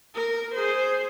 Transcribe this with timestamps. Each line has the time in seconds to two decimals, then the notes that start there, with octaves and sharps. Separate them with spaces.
0.15 A#4
0.55 G#4 C5